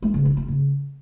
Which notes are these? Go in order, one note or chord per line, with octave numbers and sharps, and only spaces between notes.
G#3
C#3
F4
F4
C#3